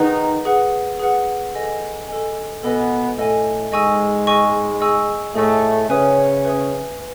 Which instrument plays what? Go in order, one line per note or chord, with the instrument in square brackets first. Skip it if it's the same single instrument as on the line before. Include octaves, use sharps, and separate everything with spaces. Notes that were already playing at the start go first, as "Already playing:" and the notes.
Already playing: [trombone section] D#3 D#4 [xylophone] G#4 B4 F#5
[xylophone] G#4 B4 F#5
G#4 B4 F#5
A4 D#5 G#5
A4 D#5 G#5
[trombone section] B2 B3 [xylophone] A4 D#5 G#5
[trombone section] A2 A3 [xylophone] A4 D#5 G#5
[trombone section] G#2 G#3 [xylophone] G#4 D#5 G#5 C#6 E6
[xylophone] G#4 D#5 G#5 C#6 E6
G#4 D#5 G#5 C#6 E6
[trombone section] A2 A3 [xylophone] G#4 D#5 G#5 C#6 E6
[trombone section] C#3 C#4 [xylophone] B4 E5 G#5 D#6
[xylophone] B4 E5 G#5 D#6
B4